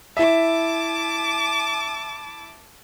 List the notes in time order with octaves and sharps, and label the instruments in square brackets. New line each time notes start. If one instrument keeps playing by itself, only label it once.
[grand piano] E4 E5 [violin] A5 D6